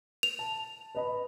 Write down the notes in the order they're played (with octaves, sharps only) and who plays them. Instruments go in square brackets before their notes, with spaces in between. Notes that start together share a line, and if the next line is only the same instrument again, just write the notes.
[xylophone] F7
[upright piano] A5
B4 D#5 B5